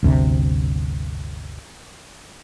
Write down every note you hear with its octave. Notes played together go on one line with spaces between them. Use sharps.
G1 D2 C3